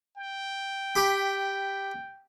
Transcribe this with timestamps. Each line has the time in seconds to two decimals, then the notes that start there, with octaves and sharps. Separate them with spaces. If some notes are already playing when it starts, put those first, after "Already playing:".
0.17 G5
0.96 G4 B5